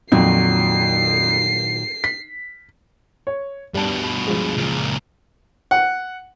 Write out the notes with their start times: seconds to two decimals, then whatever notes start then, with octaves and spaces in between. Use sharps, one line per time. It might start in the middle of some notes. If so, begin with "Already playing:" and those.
0.12 F2 A#2 D#3 F#3 C7
2.04 B6
3.27 C#5
3.74 G2 B2 G3 A5
4.27 F3 G#3
4.57 C#2 A#2
5.71 F#5